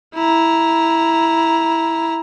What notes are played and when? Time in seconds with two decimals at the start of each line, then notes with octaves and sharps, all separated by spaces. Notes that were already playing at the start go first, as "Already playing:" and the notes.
0.15 E4 A#5